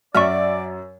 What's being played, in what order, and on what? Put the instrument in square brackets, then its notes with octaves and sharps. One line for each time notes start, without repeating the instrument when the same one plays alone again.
[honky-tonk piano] F#2 [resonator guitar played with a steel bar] F#4 E5 [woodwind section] D5 [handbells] C#6 F6